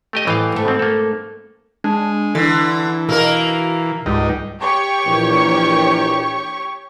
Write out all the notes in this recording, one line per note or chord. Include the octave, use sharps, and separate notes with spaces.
A3 G4 D#5
A2 E3 G4 D#5 F5
G#2 A3
B2 C4
A#3 A4
G#3 D4
D3 E3
B2 A#3 A#4
C#2 G#2 G3 D#4
G4 C#5 C#6
A#1 E3 A#4